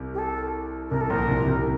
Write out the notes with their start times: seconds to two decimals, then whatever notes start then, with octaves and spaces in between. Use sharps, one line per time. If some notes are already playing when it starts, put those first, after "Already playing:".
Already playing: C2 C3
0.14 G4
0.18 A4
0.91 C2 C3 A#4
1.01 A4
1.10 A#1 A#2 A#4
1.28 C2 C3
1.46 C2 C3